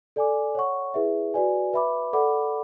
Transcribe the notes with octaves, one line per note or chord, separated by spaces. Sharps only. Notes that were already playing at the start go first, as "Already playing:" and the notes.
A4 D5 G#5 D6
C#5 F#5 C#6
E4 G#4 B4 E5
F#4 B4 D5 G#5
B4 E5 B5 D6
A4 D5 F#5 B5 D6